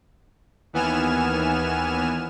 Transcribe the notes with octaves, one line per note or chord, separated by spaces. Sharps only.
D#2 E3 B3 G#5 F6 E7